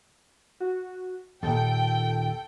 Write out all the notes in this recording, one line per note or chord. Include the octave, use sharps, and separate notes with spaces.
F#4
D#2 A#2 A4 G5